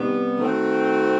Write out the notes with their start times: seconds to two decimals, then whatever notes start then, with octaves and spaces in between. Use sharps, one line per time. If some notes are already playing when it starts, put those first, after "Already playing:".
Already playing: C3 D#3 G3 B3
0.39 D#3 A3 C4 F#4